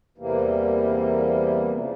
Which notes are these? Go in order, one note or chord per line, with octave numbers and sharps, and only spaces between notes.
E2 C3 E3 G3 A#3
C#3 F3